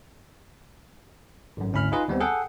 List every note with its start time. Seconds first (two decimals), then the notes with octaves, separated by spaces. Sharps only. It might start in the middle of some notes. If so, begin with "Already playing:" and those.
1.57 G#1 F#2
1.72 G#1 D2 C#4 E4 B5 F6
1.92 D#4 F4 G#4 B4 D#5
2.08 D#2 G3 B3 C4
2.20 G#4 A4 F#5 G5